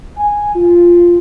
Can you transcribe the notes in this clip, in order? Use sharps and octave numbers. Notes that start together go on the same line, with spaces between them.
G#5
F4